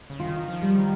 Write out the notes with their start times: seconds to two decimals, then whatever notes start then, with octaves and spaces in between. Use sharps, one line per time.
0.10 C#3
0.19 D#3 F4
0.48 F3
0.62 G3
0.75 D#3